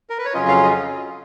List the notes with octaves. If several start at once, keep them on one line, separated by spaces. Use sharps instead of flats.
A#4
B4
C#5
F2 C#3 F#3 C#4 F4 D#5
F5
D#5